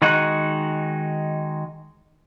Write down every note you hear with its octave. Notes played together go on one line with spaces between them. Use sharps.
D#3 G#3 D#4 F#4 F#5